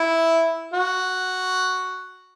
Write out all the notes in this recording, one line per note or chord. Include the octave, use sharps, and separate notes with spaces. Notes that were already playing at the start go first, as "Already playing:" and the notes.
Already playing: E4
F#4